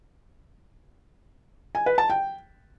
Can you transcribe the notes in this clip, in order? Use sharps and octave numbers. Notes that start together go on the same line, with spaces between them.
G#5
B4
A5
G5